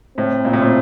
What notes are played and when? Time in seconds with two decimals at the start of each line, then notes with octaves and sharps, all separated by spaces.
0.18 A2 C4
0.45 A#2
0.53 A2
0.62 A#2